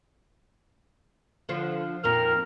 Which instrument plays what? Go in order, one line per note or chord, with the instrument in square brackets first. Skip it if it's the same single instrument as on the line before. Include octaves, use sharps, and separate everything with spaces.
[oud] D3 F3 F4
[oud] F2 A#2 D#3 [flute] A#4 [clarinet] F6